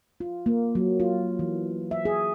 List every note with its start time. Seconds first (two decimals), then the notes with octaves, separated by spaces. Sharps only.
0.20 F4
0.46 A#3
0.75 F#3
1.00 F4
1.39 E3
1.91 E5
2.05 G#4